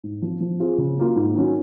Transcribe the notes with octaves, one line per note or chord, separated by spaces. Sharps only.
G#2
F3 C4
F3
C4 F4 G#4
C#3
F#3 A#3 F4
G#2
D#3 F#3 C#4